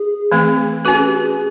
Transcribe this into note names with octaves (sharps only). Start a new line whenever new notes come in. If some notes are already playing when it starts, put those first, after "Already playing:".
Already playing: G#4
E3 A3 C4
C#4 F#4 A4 B4
G#4
G4
G#4